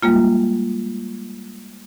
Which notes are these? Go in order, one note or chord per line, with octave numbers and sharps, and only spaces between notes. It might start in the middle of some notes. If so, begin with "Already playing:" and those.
G3 G#3 A#3 F4